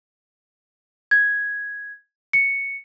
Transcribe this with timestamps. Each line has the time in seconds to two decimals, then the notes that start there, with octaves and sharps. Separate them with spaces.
1.11 G#6
2.33 C#7